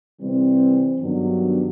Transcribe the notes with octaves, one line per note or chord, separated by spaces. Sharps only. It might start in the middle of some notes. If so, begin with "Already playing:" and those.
C3 E3 G3 C4
G2 D#3 F#3 B3 D4